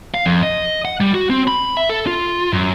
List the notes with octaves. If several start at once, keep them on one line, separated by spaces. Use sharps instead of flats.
F5
F2
D#5
F#5
G3
F#4
C4
B5
E5
A4
F4
F#2